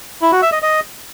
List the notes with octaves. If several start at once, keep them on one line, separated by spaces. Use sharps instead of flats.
E4
F#4
E5
D#5
D#5